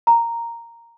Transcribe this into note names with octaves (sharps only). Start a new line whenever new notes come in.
A#5